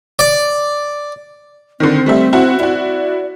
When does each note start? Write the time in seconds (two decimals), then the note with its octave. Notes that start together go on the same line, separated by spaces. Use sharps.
0.19 D5
1.80 D3 D#3 C4
2.06 G3 A3 E5
2.33 E4 F#4 F#5
2.60 E4 F#4 D5